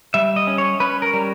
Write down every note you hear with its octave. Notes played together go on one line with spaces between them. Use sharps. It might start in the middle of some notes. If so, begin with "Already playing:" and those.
G3 E5
D#5
C#4
C#5
C#4 B4
A#4
G3